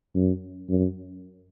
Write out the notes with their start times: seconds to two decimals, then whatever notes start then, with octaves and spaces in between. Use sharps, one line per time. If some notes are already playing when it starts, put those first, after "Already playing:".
0.15 F#2
0.69 F#2